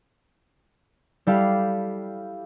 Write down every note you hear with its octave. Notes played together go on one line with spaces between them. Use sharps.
G3 E4 G4 A4 F5